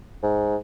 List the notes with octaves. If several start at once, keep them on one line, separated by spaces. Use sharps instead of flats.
G#2